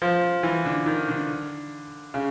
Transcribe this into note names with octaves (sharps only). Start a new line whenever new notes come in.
F3
E3
D3
D#3
D3
C#3